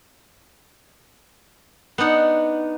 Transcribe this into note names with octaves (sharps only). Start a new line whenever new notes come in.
B3 D4 D#4 F#5